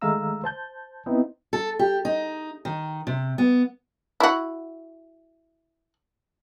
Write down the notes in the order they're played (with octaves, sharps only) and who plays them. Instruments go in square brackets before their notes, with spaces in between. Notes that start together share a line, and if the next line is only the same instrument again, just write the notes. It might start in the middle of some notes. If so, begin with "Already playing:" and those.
[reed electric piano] D#3 G#3 A3 F5 A#5 E6
C5 A5 G6
B3 C4 D#4 E4
[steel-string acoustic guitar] A4
G4
D#4
D#3
C3
B3
[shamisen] E4 F#4